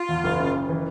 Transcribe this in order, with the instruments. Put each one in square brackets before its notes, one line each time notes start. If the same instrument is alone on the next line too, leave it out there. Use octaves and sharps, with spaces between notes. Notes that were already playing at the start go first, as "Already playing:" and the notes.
Already playing: [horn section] F4
[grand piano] E2
F#1
C#3
F#1
E3